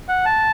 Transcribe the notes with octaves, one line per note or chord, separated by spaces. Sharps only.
F#5
A5